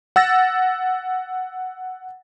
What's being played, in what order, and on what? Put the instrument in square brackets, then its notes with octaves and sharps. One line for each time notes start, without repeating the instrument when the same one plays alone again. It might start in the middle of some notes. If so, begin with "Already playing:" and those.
[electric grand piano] F#5 E6 A6 A#6